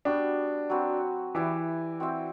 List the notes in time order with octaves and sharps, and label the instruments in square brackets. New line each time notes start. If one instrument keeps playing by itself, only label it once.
[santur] G3 B3 F#4 [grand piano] D4
[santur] F#3 C4 F#4 B4
[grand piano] E3 [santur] E4 G4 B4 D5
[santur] C4 F#4 C5 E5